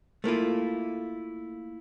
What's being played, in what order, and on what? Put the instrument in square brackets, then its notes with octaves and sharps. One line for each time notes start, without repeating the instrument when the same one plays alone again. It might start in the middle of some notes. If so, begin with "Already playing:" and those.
[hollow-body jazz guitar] A3 A#3 E4 F4